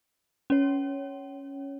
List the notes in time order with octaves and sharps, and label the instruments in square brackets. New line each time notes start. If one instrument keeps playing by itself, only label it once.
[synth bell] C#4 C#5